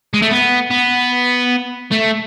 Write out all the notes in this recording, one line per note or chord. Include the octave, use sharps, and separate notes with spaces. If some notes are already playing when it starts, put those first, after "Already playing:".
G#3
A3
B3
B3
A3